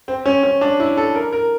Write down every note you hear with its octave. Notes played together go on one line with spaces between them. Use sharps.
C4
C#4
C#4
D4
E4
A4
A#4
A#4